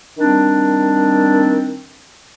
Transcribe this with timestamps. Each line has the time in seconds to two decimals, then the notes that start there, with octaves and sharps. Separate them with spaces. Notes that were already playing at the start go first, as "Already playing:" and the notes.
0.19 D#3 G3 C4 D4